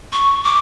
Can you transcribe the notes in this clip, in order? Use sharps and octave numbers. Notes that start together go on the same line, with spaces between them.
C#6
D6